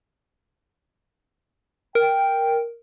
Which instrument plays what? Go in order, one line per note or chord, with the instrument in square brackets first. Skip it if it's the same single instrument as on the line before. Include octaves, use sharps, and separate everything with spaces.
[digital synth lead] A#4 [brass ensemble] G5